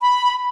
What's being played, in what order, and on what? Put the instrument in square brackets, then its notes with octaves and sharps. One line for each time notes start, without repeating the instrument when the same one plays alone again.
[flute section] B5